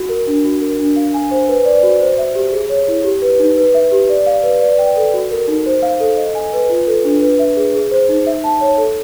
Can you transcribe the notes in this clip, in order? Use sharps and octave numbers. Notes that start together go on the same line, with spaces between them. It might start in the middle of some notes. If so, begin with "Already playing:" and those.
Already playing: F#4
A#4
D4
F#4
A#4
D4
F5
G#5
C5
B4
D5
F#4
C5
E5
G4
G#4
C#5
E4
G4
B4
D#4
B4
E5
G4
D5
F5
B4
D5
G5
A4
F#4
A#4
D#4
C5
F5
A4
D#5
G#5
B4
F4
A4
D4
B4
E5
G#4
G#4
C5
D#4
E5
A5
C#5
A4